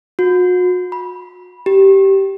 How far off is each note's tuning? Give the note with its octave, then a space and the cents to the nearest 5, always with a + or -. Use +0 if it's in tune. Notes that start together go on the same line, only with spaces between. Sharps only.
F#4 -40
B5 -15
G4 -15